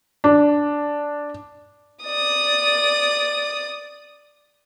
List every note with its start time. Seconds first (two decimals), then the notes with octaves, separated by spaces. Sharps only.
0.24 D4
2.05 D5 D#6